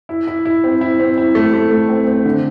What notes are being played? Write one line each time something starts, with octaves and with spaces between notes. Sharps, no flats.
E4
E4
E4
C4
E4
C4
E4
A3
A3
A3
C4
C4
D3